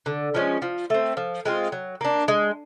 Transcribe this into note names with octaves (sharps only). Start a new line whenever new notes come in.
D3
F3 G#3 C#4
F3
A3 C4
F3
G#3 C4 F4
F#3
A#3 D4
G#3